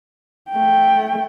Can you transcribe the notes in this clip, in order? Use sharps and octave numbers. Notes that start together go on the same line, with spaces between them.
A3 G5